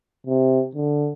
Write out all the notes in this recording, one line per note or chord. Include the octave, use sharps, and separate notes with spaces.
C3
D3